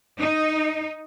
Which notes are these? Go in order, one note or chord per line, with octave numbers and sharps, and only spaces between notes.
D#4